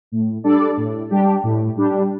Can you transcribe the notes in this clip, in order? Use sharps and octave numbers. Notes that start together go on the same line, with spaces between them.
A2
G3 D4 A4 D5
A2
G3 D4 G4
A2
G3 D4 G4